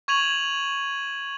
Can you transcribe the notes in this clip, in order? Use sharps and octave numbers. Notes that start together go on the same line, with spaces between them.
C#6 G#6 D#7 F7 F#7